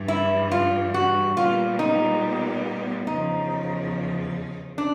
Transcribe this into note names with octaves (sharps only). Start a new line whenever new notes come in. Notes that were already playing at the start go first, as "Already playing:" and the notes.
Already playing: G2 E3 G3
E4
F4
F#4
A#2 G3 B3 F4
D#4
E2 C#3 F3 D#4
D4